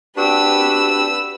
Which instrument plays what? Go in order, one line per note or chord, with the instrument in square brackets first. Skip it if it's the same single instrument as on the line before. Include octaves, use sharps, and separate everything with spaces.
[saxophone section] D4 F#4 G4 [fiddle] B4 E6